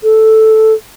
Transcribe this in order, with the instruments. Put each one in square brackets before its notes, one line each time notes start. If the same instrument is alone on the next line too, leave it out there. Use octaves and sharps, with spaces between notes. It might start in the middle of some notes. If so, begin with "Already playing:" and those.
[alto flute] A4